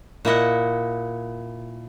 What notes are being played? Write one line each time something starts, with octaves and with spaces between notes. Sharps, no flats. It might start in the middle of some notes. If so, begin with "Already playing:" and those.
A#2 E4 D#5 F#5